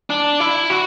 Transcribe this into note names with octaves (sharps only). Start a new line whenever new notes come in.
D4
E4
F#4